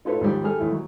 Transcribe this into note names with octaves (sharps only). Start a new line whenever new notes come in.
D#4 F4 A4 B4 C#5
D#2 G#2 F3 G3
G3 G#4 A4 F6
D#2 E3 A3
F#3